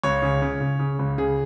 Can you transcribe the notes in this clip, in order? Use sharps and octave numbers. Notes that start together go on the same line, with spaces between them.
C#2 C#5
C#3
C#3
C#3
C#3
C#2
C#3 G#4